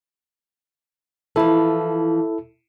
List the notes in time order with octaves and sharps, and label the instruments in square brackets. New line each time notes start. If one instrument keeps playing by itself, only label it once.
[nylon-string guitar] E3 F3 [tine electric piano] E4 A4